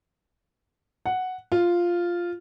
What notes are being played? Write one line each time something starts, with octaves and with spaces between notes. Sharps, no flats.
F#5
F4